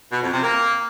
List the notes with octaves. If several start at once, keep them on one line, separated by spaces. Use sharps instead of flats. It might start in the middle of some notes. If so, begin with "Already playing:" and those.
B2
F2
C3
A#3